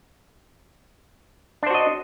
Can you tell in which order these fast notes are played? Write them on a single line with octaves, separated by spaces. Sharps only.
D4 C5 F#4 D#5